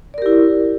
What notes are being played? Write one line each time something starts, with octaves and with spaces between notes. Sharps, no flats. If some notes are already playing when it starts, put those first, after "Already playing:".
E4 G4 A#4 D5